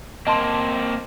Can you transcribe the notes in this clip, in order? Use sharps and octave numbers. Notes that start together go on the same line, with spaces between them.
A#3 C4 D#5 A5 C6